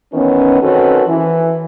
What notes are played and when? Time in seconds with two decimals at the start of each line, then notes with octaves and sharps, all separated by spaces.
0.13 D#3 E3 B3 C#4
0.61 D#3 C4 C#4 F#4 A4 B4
1.07 E3